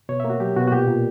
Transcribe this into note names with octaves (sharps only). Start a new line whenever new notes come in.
B2 C#5
A#3 E5
F#4
F#3 G4
B2 F#4
F#4
A#2 G4
A#2